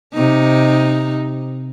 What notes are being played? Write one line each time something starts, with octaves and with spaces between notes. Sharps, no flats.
C3 D#4